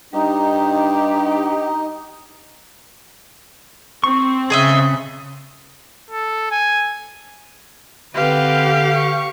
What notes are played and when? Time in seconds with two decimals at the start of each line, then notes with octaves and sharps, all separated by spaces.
0.14 G2 D#4 G4
4.04 C4 C#6
4.50 C#3 G#4 D#5 E5
6.10 A4
6.51 G#5
8.14 D3 C4 G4 B4 F5
8.94 C#6